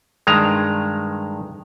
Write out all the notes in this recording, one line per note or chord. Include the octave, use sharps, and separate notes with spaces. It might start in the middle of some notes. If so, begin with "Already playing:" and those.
G2 D#3 G#3 A#5